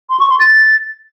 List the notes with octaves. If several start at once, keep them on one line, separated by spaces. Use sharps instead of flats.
C6
C#6
C6
A6